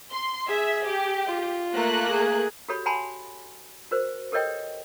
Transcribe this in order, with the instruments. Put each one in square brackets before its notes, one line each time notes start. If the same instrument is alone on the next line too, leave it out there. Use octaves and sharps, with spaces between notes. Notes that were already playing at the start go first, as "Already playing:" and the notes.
[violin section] C6
[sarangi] G#4 [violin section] E5
[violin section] G4
[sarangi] F4
[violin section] A3 A#3 F#6
[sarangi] G#4
[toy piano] F#4 G4 A4 C#5 B5
F#5 G#5 A5 B5 C6
F#4 A#4 C5
G4 A4 A#4 C#5 D#5 G5